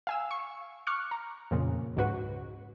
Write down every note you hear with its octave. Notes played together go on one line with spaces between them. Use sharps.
F5 G#5 E6
C#6
C#6 D6 F6 F#6 C#7
A#5
F2 A#2 C#3
C#2 G#2 F#4 B4